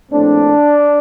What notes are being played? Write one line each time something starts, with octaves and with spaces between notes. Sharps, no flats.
A#1 A2 A3 C4 D4